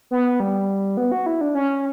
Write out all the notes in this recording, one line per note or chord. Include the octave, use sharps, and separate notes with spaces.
B3
G3
B3
F#4
E4
D4
C#4